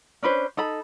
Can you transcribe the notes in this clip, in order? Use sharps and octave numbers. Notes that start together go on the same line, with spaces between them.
C#4 D4 B4 C5
D#4 A4 B5